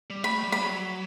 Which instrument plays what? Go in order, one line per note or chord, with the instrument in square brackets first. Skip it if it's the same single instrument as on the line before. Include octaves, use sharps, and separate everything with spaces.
[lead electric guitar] G3
[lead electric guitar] A3 [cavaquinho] B5
[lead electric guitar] G3
[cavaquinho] B5
[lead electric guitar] F#3